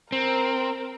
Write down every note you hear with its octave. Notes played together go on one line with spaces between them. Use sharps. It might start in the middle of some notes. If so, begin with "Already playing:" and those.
C4 A#4